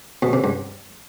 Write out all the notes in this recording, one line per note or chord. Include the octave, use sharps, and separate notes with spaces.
B2
C3
G2